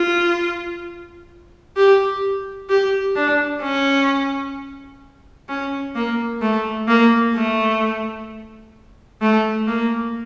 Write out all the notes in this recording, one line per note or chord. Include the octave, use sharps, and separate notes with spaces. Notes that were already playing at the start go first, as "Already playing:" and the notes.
Already playing: F4
G4
G4
D4
C#4
C#4
A#3
A3
A#3
A3
A3
A#3